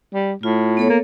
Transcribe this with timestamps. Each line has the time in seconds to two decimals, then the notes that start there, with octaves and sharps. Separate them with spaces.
0.14 G3
0.43 A2 F4
0.77 B3 A4 C#5
0.90 A#3